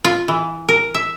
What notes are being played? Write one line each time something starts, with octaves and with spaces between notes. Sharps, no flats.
F4
E3
A#4
E5